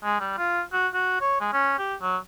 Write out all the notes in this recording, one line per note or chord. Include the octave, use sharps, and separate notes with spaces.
G#3
G3
F4
F#4
F#4
C#5
G#3
C#4
G4
F#3